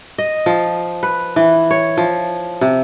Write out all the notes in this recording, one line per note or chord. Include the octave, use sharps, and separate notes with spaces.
D#5
F3
B4
E3
C#5
F3
C3